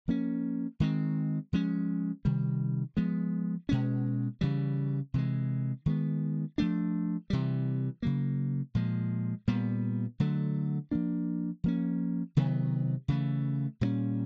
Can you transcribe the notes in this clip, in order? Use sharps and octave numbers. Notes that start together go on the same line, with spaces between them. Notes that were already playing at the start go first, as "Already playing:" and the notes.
F3 A#3 C#4
D#3 G#3 C4
F3 G#3 C#4
C3 D#3 G3
F3 G#3 B3
B2 G#3 C#4
C#3 E3 G3
C3 E3 G#3
D#3 G#3 B3
F3 A3 D4
C3 E3 G3
C#3 F#3 A#3
A#2 F3 G#3
A#2 G3 B3
D3 F#3 A3
F3 A#3 D4
F3 A#3 C#4
C3 D#3 F#3 B3
C#3 E3 A3
A#2 G3 A#3 C#4